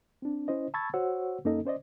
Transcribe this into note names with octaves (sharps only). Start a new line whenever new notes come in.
C4 D4
C#4 E4 C5 D#5
A5 B5 C#6 E6 G#6 A6
F#4 C5 C#5 F#5 E6
F#2 A#3 C#4 D#4 A4 D#5
C#4 C5 D5 D#5